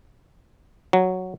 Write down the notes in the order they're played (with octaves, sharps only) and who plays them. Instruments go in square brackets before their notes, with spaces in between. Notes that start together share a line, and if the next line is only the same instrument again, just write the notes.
[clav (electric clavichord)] F#3